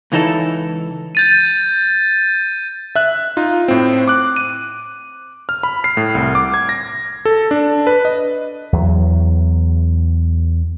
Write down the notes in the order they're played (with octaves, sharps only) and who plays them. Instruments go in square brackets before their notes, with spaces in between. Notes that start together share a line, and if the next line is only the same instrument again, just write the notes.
[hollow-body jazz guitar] C#2 E3 D#4 E4 A4
[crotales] G6 A6 D#7
[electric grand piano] E5 F#6
D#4 F4
A2 C4
D6 F#6
D#7
F6
B5
C7
A2
C2
D6
G#6
A#6
A4
D4
B4
D#5
[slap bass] E2 F#3